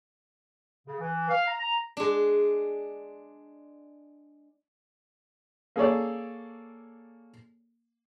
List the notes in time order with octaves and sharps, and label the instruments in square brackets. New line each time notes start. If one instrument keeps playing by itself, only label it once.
[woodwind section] C#3
E3
F5
A#5
A#5
[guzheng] G#3 D4
[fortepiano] A#3 G#4 A4 C#5 D5